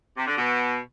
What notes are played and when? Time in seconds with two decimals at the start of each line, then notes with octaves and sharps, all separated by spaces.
0.17 C3
0.27 D3
0.38 B2